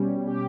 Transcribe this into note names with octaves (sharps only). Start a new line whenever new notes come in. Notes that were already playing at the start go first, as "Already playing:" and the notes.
Already playing: B2 G3 C#4
G4